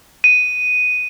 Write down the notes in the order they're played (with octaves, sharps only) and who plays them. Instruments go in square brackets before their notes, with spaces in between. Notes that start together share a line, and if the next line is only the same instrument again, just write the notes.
[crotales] D#7